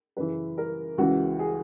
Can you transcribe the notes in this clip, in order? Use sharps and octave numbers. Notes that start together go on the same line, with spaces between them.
F#2 C#3 E3 B4
A#4
C#2 C#3 E3 F#4
G#4